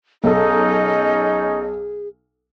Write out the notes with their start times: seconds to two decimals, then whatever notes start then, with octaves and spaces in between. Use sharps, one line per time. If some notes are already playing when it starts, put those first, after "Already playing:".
0.24 B1 C#4 D#4 G#4 A4 D#5